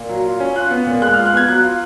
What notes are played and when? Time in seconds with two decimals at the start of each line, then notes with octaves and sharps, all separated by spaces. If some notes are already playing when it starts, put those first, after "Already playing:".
Already playing: A#2
0.09 F#3
0.25 F4
0.40 C#4
0.56 F4 F#6
0.71 B3
0.86 A#2
1.02 G#3 F#6
1.13 F4 F6
1.26 F#6
1.33 B3 G#6
1.48 F#3 F#6
1.63 F4